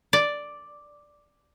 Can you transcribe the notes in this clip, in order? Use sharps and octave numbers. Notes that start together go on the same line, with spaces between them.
D5